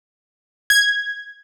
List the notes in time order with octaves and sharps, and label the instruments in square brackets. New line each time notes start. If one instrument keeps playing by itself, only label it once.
[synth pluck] G#6